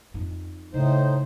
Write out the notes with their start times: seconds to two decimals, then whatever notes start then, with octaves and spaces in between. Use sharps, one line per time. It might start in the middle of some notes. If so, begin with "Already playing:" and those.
0.14 F2 D#4
0.74 A2 C#3 D#4 C5